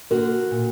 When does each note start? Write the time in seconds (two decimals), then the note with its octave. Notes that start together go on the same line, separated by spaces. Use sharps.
0.10 D3 A#3 F#4 A#4
0.51 A#2